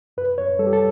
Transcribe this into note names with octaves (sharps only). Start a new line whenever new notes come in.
F#2 B4
F#2 C#5
G3 A4
G4
A4